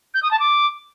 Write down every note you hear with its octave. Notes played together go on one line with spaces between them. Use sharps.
G6
D#6
A5
D6